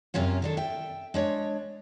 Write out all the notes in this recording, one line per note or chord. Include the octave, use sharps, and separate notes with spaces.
F#2 C3 A#3 C#4 F4
D#3 D4 A4
E5 G5
G#3 D4 C#5